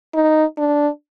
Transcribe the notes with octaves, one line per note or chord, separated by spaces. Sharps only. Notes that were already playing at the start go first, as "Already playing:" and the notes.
D#4
D4